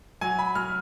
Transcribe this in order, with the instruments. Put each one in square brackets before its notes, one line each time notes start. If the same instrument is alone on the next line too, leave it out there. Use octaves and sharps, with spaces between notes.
[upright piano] F#3 [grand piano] G#5
[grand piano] B5
[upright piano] F#3 [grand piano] F6